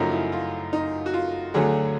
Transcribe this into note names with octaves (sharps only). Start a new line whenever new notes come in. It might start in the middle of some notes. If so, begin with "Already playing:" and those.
Already playing: F#2 C#3 F3 A3 D#4
E4
F4
D#4
F#4
F4
D2 D3 F#3 A3 G#4